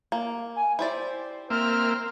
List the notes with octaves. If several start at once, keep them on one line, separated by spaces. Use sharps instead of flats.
A#3
G#5
E4 G4 C5 D5
A#3 C4 E5 F6